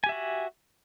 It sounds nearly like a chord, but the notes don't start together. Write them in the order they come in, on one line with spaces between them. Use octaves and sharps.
G#5 G4 E5 F#4